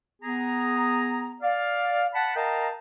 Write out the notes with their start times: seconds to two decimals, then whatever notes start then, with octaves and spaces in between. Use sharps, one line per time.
0.22 B3 G#4 A#5
1.42 D5 F5
2.14 F#5 A5 B5
2.36 A#4 D#5 F5 G5 A5 A#5